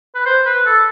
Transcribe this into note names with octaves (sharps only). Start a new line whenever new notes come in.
B4
C5
B4
A4